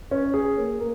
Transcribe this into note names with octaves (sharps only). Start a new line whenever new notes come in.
C#4
G#4
A#3
A#3